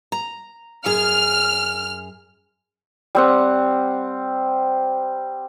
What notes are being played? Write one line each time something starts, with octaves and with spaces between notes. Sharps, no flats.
A#5
F#2 G#4 F6
G3 C4 F#5